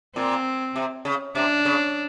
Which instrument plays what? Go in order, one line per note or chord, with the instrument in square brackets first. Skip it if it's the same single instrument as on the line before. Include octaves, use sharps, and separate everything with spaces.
[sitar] A#2 [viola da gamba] C4
[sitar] C3
C#3
[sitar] C3 [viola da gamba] D4
[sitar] C#3